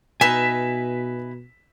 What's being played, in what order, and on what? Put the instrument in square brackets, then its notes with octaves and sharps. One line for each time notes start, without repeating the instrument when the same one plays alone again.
[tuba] B2 [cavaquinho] D#4 B4 E5 [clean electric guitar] G#5 [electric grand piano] B6 E7